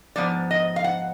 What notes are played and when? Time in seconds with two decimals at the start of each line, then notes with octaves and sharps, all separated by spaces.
0.16 G#2 F3 B3 D5
0.51 D#5
0.76 F5
0.84 F#5